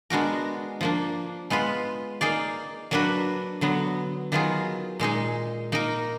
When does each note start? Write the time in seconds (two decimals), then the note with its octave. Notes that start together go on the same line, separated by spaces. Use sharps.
0.10 G#3 B3 D4 F#4 A#4
0.81 F3 A#3 D4
1.50 G#3 B3 F4 B4
2.21 A#3 D#4 G#4 D5 F5
2.91 F#3 A#3 D4 F#4 B4
3.61 D3 F#3 B3
4.32 D#3 F#3 B3 F4 G#4
5.00 A#2 G#3 D#4 G#4
5.72 A#3 D#4 A#4